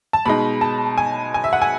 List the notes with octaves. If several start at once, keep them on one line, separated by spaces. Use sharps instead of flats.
A5
B2 G#3 D#4 B5
A5
G#5
G#5
E5
F#5
G#5